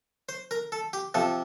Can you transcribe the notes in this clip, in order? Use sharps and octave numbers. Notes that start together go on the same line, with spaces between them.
C5
A#4
A4
G4
C3 F3 A4